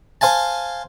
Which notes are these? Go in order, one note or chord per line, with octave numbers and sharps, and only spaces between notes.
C5 F5 G#5 A5